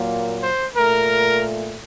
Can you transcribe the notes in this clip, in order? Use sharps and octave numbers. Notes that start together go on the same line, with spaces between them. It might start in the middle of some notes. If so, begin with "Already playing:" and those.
Already playing: A#2 F#3 A#3
C5
A#2 A3 A#4